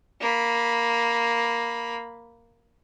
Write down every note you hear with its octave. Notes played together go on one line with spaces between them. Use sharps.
A#3 B5